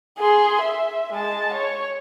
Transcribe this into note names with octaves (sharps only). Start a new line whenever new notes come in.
G#4 C6
E5
G#3 A5
C#5